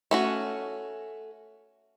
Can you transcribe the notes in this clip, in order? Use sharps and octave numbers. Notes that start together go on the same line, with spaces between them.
A3 C#4 F#4